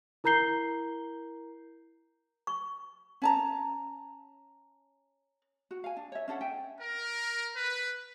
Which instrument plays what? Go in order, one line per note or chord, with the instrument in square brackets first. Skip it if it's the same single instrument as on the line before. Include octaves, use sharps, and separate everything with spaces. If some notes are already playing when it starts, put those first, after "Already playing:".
[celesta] E4 A#4 A#5 G6 C7 G7
[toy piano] C#6
[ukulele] C#4 A5 A#5
F#4
F5 G#5
D4
C#5 E5
C#4 D4 A4 F#5
E5 G5 G#5
[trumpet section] A#4
B4